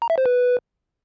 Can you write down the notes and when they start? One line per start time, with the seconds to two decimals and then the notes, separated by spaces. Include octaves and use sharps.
0.02 A#5
0.10 E5
0.18 C5
0.26 B4